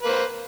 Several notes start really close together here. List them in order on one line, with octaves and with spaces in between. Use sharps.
B4 A#3 C5